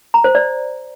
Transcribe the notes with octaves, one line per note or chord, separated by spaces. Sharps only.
A#5
C5
D5